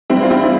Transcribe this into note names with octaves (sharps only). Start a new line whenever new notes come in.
G2 E3 C4 E4
F4
C4 E4
E4